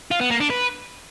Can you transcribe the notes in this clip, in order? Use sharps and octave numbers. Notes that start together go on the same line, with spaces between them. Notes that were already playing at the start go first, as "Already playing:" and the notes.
F4
B3
A#3
D4
B4